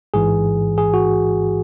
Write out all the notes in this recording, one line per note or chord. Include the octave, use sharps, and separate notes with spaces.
A1 G#2 E3 G#4
G#4
F#4